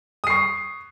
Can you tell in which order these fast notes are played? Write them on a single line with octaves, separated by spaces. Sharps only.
D#6 C7 C#6